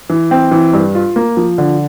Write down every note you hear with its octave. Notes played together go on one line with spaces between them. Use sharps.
E3
C4
E3
G2
F4
A#3
F3
D3